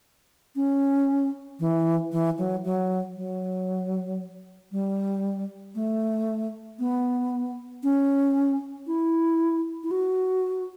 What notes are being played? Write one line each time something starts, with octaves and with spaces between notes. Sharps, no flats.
C#4
E3
E3
F#3
F#3
F#3
G3
A3
B3
C#4
E4
E4
F#4